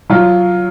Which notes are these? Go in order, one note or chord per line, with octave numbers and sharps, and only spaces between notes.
F#3 F4